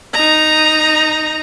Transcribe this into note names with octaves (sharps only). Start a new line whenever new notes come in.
D#4 A#5